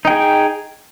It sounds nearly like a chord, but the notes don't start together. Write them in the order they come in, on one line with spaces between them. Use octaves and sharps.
D#4 G5 G#4